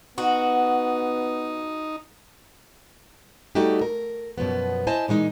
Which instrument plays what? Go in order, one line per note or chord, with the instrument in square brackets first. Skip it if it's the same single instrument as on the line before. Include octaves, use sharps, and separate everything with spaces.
[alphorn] B3 [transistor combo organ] D#4 [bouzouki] F#4
[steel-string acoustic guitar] G3 A3 D#4 F#4 G4
A#4
F#2 B2 F3 B3
E4 C5 D#5 G#5 A5
A#2 E3 G#3 D#4